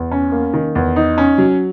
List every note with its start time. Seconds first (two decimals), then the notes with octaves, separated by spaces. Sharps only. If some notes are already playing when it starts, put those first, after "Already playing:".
Already playing: E2
0.11 C#4
0.32 A#3
0.54 D#3
0.75 E2
0.96 D#4
1.18 C#4
1.38 F#3